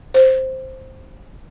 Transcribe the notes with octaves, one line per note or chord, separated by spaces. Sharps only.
C5